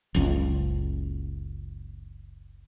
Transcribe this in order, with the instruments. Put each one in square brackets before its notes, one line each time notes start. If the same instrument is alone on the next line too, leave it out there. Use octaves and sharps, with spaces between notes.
[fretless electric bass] F#1 C#2